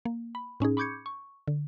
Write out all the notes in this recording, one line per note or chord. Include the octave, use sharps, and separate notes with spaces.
A#3
B5
A2 C#4 D#4 G#4
B5 C#6 D6 G6 G#6 C#7
C#6
D3